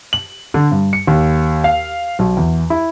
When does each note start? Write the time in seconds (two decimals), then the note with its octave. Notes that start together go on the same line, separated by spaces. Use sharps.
0.13 F#7
0.54 D3
0.71 G2
0.93 C#7
1.07 D#2
1.64 F5
2.19 B1
2.37 E2
2.70 E4